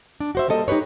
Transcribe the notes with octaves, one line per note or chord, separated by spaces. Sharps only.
D4
F#4 C5 E5
G3 A#3 A4 D#5
D#4 G4 A4 B4 C#5